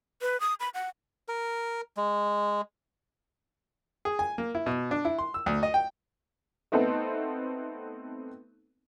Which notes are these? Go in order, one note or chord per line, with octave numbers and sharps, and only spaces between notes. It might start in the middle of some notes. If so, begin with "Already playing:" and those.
B4
D#6
B5
F#5
A#4
G#3
G#4
G#5
A#3
E4
B2
D4
E4
C6
E6
D2
D#5
G5
A3 B3 C4 D#4 A4